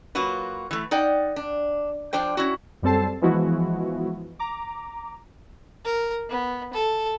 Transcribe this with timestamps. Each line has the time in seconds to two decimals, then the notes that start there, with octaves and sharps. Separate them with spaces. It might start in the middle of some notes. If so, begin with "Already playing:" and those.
0.15 F#3 A#3 F4 F#4 B4
0.71 E3 A3
0.91 D#4 D5 F#5 G5
1.36 D4
2.13 F3 D4 C5 G5
2.37 C#4 E4 F#4
2.82 F#2 G3 C4 A4 A5 C7
3.22 E3 F3 G#3 B3 E4 F#4
4.39 A#5 D6
5.85 A#4
6.30 B3
6.74 A4